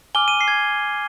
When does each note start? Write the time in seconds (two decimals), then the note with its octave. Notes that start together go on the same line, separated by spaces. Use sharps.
0.15 G#5 D6 F6 G7
0.28 D#7
0.41 C7
0.48 G#6